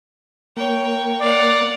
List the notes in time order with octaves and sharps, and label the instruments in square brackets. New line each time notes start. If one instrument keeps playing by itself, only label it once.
[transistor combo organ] A#3 [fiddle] C#5 G5
[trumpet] D5 [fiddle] F5 F#5